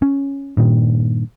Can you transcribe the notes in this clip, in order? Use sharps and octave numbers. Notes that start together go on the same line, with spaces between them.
C#4
G2 A#2 D#3